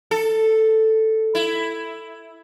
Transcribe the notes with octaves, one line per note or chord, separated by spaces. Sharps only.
A4
E4